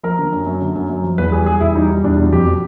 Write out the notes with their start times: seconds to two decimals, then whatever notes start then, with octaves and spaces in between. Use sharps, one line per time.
0.03 F3 A#4
0.19 D3
0.32 F#2
0.47 F#2
0.62 D3
0.75 F#2
0.89 F#2
1.04 F3
1.18 E2 B4
1.32 G3 G#4
1.46 G3 G#4
1.60 E2 E4
1.75 G3 D#4
1.90 G3
2.04 E2 D4
2.18 B2
2.33 F2 G4